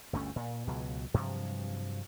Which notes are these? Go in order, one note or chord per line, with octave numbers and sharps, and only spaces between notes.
G1 D2 A3 C#4
A#2
C#2 B2 F#3
G2 C3 F3 F#3